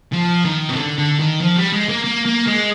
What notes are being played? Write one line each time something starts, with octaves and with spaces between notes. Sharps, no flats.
F3
D#3
C3
D3
D3
D#3
F3
G3
G#3
A#3
A#3
A#3
G#3